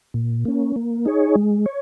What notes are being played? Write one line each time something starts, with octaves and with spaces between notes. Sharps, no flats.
A#2
A#3 C#4
A#3
D#4 G#4 C#5
G#3
C#5